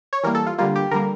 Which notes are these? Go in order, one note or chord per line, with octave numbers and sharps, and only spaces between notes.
C#5
E3 G3 A#3 A#4
A4
F4
D3 G3 A#3 F4
G4
D3 G3 A#3 A#4